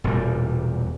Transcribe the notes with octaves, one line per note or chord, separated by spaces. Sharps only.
E1 E2 A#2 G3